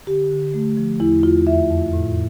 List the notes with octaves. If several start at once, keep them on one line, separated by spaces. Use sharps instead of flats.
D3 G4
D3
A3
F3
E2 E4
E2 F4
F2 E5
F2
A2